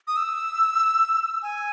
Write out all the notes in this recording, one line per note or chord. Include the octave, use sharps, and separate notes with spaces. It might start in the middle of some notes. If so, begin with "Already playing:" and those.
D#6
E6
G#5